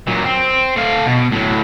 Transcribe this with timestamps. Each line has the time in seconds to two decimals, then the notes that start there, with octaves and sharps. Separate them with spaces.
0.07 A#2 F#3
0.25 C4
0.76 A3 F5
1.06 B2
1.32 A2 F#3